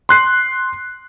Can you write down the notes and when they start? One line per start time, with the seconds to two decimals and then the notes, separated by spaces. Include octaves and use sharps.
0.09 C6 F#6 C7